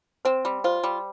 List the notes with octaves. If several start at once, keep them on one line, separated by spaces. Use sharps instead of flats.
C4 C5
G3
F4 C5
G3